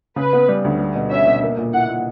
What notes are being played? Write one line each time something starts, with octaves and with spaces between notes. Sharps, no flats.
C#3 B4
B3
G3
D2
G3
B2
C#4 E5
B2
A#3
A#2
E4 F#5
A#2